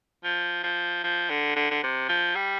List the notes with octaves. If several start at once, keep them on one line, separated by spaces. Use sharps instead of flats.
F3
F3
F3
D3
D3
D3
C3
F3
G3